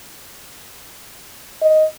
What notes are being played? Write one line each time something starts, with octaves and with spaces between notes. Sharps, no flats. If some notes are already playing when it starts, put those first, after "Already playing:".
D#5